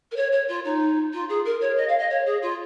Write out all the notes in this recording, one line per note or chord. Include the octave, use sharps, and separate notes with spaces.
A#4
C#5
C#5
F4
D#4
F4
G#4
A#4
C#5
D#5
F5
D#5
C#5
G#4
F4